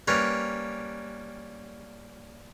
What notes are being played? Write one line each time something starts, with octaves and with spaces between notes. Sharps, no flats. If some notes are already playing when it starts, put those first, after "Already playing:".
G3 A#3 C#4 A#4 B4